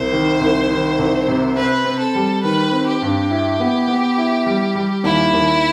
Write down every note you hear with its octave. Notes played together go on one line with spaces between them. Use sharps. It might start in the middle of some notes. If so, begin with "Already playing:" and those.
Already playing: C2 C5
D#3
C2
D#3
C2
C3
C4 B4
C4
A4
G3
D#3 B4
C4
G4
G2
E4
B3
B3
E4
G3
G3
D#2 E4
D#2